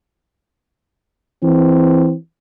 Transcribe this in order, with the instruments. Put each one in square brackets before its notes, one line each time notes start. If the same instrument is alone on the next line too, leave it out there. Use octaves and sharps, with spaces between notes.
[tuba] E3 [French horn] C4